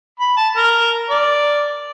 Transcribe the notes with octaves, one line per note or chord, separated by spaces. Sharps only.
B5
A5
A#4
D5